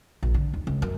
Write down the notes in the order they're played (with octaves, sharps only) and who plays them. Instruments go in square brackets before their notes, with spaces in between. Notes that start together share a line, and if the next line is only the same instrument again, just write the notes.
[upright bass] A#1
D3
D#2
C#2
F#2